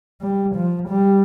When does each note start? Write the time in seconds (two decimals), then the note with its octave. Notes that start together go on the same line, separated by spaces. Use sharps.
0.22 G3
0.56 F3
0.89 G3